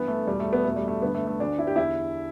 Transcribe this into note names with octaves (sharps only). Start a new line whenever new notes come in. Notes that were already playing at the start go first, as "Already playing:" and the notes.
Already playing: G2 E3 B3
A3
E2 B2 G3
A3
B3
E2 B2 A3
G3
A3
G2 D3 B3
A3
A3
D2 D3 D4
E4
G4
E2 D3 E4